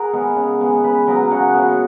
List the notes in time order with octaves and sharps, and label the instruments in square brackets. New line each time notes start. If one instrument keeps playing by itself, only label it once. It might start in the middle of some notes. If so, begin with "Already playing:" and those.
Already playing: [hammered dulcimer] G#4 A#4 F#5 A#5
G#3 B3
C#3
G#3 B3
C#3 B4 B5
F#3 B3 A#4 A#5
C#3 F#4 F#5
F#3 B3